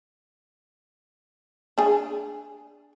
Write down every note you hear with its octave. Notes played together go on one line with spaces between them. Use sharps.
D4 G#4